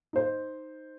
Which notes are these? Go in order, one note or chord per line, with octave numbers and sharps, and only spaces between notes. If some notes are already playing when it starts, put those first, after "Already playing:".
D#4 C5